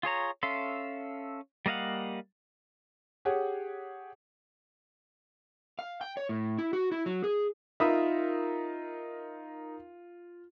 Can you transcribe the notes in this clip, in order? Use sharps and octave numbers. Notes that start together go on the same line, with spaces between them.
F4 G#4 C#5 A#5
C#4 A4 E5 F5 C6
G3 A#3 D#5 F5 F#5
G4 G#4 C#5 F#5
F5
G5
C#5
A2
E4
F#4
E4
F#3
G#4
D#4 F4 A#4 E5 B5 D#6